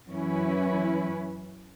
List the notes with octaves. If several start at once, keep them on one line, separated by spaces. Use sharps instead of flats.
F#2 E3 C#4 E4 B4